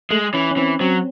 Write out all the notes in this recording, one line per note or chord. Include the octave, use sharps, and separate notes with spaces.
G#3 A3
E3 C#4
C#4
E3 C4
F#3 C4